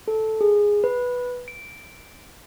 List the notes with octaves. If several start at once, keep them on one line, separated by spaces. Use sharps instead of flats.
A4
G#4
B4
D7